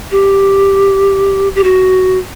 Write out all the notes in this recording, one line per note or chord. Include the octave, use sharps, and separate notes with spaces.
G4
G4
F#4